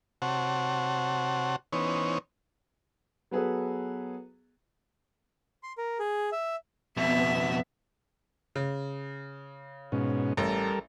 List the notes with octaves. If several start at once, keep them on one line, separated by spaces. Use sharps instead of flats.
C3 F#4 C5 C#5 F#5 A5
E3 B3 C#4 D#4 C5 C#5
F#3 B3 G#4 A4 B4
C6
A#4
G#4
E5
F2 B2 B3 E5
C#3
G#2 B2 C#4
A1 G3 A4 A#4